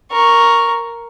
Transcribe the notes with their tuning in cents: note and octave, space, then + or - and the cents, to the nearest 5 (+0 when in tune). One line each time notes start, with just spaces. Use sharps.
A#4 +0 C#6 +0